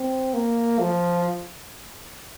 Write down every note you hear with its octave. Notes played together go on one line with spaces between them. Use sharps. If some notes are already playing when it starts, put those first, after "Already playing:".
Already playing: C4
A#3
F3